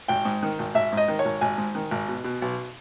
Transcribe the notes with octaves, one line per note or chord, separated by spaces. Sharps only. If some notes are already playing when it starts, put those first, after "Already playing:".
G#1 G5
G#2
D#3
G#1
G#1 E5
G#2
D#5
D#3
C#5
G#1
G#1 G#5
G#2
D#3
G#1
B2
B2
B1